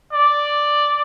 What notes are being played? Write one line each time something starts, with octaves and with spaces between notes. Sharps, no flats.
D5